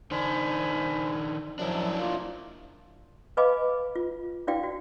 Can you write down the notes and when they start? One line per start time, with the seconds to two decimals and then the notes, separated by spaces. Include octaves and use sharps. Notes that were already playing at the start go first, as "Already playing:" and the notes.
0.11 D#3 D4 C5 G#5 B5
1.59 F#2 F3 F#3 D4 E4
1.99 A#3 F4
3.37 B4 D#5 F5 G#5 B5 D6
3.95 F4
4.47 D4 E4 F#4 D5 F5 G5
4.63 F#4